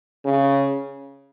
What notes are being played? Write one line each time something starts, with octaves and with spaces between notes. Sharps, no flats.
C#3